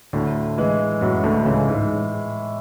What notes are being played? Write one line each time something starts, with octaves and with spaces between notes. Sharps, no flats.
D2 A2 D3
E3 G#3
F#2 A2 F#3
D2 D3
C#2 C#3 E3 G#3
G#2